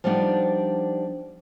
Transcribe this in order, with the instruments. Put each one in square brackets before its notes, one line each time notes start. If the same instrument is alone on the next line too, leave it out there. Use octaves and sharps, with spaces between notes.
[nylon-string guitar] F3 G3 B3 D4 D#4